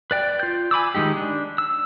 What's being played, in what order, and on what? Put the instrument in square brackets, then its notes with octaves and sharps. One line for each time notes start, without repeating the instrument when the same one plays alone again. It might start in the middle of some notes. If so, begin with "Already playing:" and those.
[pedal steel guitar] B4 D5 G5
F4 G6
G#5 B5 D6 E6
D#3 F3 G#3 D#4 G4
D4
E6